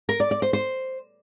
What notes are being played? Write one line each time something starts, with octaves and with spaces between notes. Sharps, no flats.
A#4
D5
D5
C5
C5